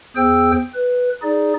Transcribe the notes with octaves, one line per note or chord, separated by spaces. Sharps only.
E2 G#4 C5 G5 E6
B4
D#4 G#4 D5